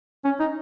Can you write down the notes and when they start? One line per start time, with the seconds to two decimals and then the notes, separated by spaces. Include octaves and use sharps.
0.24 C#4
0.40 D#4